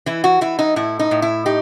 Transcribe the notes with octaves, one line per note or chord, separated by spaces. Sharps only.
E3 E4
F#4
E3 E4
D#4
A2 E4
D#4
A2
E4
D#4 G4